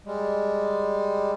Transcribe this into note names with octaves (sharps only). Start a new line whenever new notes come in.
G3 G#3